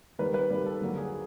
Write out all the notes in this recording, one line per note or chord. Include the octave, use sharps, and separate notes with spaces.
D#3 G3 A#3 B4
B4
D#3 G3 A#3
A4
D3 F#3 A#3
G#4